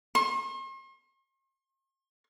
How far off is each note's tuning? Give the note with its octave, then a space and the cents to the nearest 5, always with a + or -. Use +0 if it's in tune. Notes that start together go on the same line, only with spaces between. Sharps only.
C6 +45